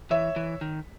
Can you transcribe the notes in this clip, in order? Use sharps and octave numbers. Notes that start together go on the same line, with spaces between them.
E3 C#5 E5
E3
D#3